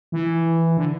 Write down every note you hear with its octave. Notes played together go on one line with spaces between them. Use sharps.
E3
D3